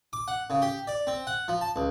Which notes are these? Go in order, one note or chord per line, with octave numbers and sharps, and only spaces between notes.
D6
F#5
C#3
G4
D5
C4
F#5
F3
A5
C#2